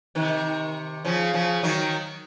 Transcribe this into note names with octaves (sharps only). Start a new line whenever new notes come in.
C3 D#3
C#3 F3
C#3 F3
D#3 F#3